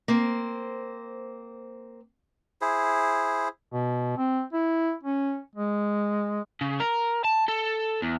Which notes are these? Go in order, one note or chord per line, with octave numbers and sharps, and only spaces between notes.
A#3 C4 C5
E4 G#4 C5
B2
C4
E4
C#4
G#3
C#3
A#4
A5
A4
E2